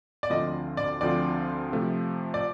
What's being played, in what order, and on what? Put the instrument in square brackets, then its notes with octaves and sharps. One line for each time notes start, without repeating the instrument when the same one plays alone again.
[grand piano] D5
[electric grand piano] D2 D3 F3 C4 F4 [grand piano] D#5
[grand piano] D5
[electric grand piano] D2 D3 F3 C4 F4 [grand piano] D5
[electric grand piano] C3 F3 A3
[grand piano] D5